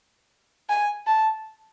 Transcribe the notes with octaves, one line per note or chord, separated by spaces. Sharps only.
G#5
A5